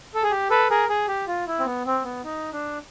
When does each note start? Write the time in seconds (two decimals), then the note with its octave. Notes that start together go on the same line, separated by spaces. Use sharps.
0.14 A4
0.23 G#4
0.31 G4
0.50 A4 B4
0.70 G#4 A#4
0.89 G#4
1.08 G4
1.27 F4
1.47 E4
1.59 C4
1.65 B3
1.86 C4
2.04 B3
2.24 D#4
2.52 D4